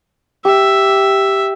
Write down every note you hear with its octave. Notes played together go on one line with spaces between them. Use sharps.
G4 E5